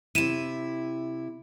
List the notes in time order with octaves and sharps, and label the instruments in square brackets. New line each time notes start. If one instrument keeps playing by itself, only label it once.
[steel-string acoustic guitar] C3 E4 [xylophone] D#7 E7